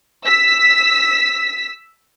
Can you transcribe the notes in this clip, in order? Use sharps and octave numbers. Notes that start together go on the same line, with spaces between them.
E6 B6